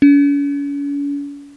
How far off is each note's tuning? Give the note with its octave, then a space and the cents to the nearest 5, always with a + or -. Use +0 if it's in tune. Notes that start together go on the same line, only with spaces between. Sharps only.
C#4 +45